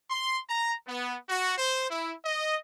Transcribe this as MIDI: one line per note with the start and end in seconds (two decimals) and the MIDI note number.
0.10 0.37 84
0.49 0.74 82
0.87 1.16 59
1.29 1.56 66
1.57 1.89 72
1.91 2.13 64
2.25 2.57 75